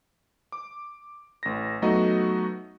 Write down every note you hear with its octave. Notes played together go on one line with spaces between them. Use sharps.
D6
A1 A#6
F#3 A3 B3 D#4 F#4 D#5